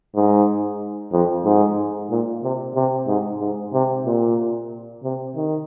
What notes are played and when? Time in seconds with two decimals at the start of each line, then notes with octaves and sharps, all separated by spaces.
0.15 G#2
1.12 F2
1.45 G#2
2.11 A#2
2.43 C3
2.75 C3
3.07 G#2
3.41 G#2
3.73 C3
4.06 A#2
5.03 C3
5.36 D#3